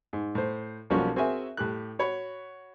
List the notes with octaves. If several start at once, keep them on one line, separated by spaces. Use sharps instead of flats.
G#2
A2 C5
B1 F3 G3 A#3 C#4 F#4
C4 F#4 G#4 A#4 E5 G#5
A2 G4 F#6
F#4 C#5 B5